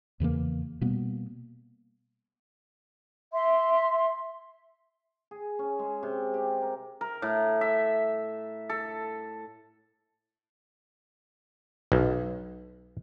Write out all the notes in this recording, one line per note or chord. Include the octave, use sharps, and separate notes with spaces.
E2 C#3 E3 A#3
B2 G3 A#3 B3
E5 C6
G#4
C#4
G#3
C3
G4
A#4
A#4
A2
E5
A4
B1